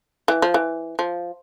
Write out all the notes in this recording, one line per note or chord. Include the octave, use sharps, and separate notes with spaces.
E3
F3
E3
F3